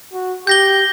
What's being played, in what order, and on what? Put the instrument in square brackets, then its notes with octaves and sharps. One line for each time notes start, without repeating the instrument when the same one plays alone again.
[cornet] F#4
[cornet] G4 [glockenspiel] G6 A#6 G7